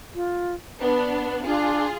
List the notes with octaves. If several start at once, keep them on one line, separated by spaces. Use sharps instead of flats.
F4
B3 D4
D4 F4 G#4